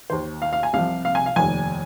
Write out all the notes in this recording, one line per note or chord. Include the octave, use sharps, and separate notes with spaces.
D#2 D#3 C5
F5
F5
G#5
C2 C3 F3 F5
F5
G#5
F5
F1 D#2 D#3 G#5